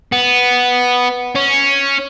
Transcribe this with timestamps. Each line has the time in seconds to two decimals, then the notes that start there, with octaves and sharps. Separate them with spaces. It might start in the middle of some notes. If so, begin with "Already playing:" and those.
0.12 B3
1.35 C#4